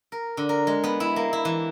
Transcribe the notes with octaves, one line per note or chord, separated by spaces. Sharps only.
A#4
D3
A#4
G#3
B3
E4
A#3
E4
E3